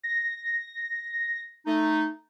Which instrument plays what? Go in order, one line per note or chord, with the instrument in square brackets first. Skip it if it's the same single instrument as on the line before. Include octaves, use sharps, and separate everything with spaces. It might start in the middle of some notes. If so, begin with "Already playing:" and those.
[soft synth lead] A#6
[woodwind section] A3 D#4